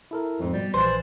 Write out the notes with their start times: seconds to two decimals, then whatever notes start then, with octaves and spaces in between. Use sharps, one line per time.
0.11 E4 A4 A#4
0.40 F2 G#2 F3
0.53 B2 G3
0.74 A#1 E3 D4 C5